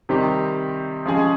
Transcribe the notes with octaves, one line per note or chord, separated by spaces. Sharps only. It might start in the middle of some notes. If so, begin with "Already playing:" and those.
C3 D#3 G3 C4 G4
F3 G#3 C#4 G#4